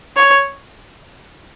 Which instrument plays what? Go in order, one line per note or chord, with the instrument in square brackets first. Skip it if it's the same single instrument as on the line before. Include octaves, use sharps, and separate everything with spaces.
[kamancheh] C#5